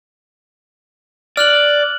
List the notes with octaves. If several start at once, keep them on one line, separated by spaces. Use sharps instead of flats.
D5 F6 F#6 F#7